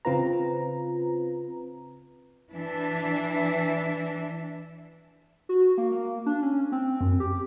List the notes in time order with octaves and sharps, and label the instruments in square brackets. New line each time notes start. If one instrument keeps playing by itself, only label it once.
[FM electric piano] C#3 C4 F4 B4 A#5
[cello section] E3 D4 E5
[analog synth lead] F#4
A#3
A#3
D4
C#4
C4
F#2
G4